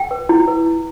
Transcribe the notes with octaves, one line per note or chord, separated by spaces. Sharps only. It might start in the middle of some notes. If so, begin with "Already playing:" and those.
Already playing: G5
B4
E4
B4
E4